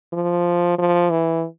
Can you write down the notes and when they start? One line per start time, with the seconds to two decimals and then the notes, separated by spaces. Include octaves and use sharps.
0.13 F3
0.78 F3
1.10 E3